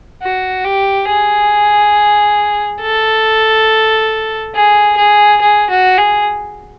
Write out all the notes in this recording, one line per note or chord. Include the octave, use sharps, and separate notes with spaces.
F#4
G4
G#4
A4
G#4
G#4
G#4
F#4
G#4